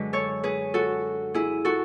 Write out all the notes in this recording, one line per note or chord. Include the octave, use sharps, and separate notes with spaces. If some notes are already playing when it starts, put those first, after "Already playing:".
Already playing: F#2 D3 G#3 B4
A4 C#5
G#4 B4
F#4 A4
E4 G#4
F#4 A4